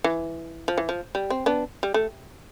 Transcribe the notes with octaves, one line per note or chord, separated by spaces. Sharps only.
E3
F3
E3
F3
G3
C4
B3 D4
G3
A3